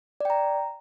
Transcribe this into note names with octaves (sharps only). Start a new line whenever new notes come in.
D5 G5 A#5